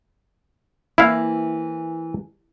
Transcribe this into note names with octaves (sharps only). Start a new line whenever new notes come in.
E3 A#3 C4 E4 F5